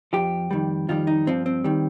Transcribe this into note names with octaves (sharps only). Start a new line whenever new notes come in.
F2 F3 G4
F2 D#3 G3
F2 D#3 G3 F4
D#4
G2 F3 C4
C4
D#3 G3